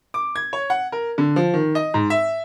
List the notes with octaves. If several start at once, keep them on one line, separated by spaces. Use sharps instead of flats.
D6
G#6
C#5
F#5
A#4
D3
F3
D#3
D#5
G#2
E5